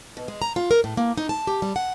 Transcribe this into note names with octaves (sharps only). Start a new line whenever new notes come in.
B2
G#3
A#5
F4
A#4
A2
A#3
D#4
A5
G4
G3
F#5